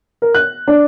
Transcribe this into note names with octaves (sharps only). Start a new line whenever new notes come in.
A#4
F#6
D4